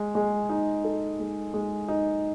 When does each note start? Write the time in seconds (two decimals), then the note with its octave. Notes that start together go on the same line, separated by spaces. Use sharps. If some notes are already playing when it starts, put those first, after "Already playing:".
Already playing: G#3
0.15 G#3
0.49 D#4
0.84 A4
1.19 G#3
1.54 G#3
1.88 D#4